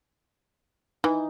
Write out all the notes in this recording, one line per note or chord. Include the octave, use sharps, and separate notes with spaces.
E3 D#4